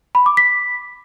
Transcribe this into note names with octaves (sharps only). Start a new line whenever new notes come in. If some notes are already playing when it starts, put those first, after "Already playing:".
B5
D6
B6